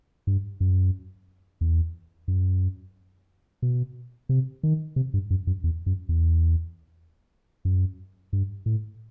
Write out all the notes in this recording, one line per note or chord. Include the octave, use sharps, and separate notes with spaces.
G2
F#2
E2
F#2
B2
C3
D#3
C3
G2
F#2
F#2
E2
F#2
E2
F#2
G2
A2